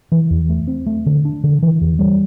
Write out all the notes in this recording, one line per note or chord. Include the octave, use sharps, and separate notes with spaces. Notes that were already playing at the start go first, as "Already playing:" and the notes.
E3
E2
A3
C4
A3
D3
D4
D3
E3
E2
G3